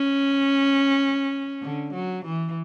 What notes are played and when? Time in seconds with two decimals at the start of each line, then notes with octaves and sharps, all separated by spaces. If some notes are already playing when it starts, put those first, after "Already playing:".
Already playing: C#4
1.63 D3
1.94 F#3
2.25 E3